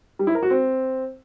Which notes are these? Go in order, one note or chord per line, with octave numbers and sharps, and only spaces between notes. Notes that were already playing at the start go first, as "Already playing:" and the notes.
G3
E4
A#4
F#4
C4